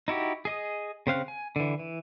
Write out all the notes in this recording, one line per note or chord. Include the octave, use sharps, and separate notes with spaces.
D#4 E4 F#4 G4
G#4 D#5 D#6
C#3 C4 F5 F#6
G#5
D3 E3
E3